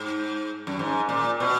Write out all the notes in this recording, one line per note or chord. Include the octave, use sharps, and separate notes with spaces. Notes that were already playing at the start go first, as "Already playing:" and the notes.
Already playing: G#2
F#2
G#2
A#2
B2